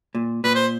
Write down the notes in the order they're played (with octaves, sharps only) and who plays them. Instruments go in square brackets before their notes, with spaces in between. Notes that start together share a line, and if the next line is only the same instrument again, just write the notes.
[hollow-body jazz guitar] A#2
[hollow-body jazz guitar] A#2 [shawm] B4
[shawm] C5